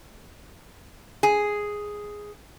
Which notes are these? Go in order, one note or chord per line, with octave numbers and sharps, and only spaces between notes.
G#4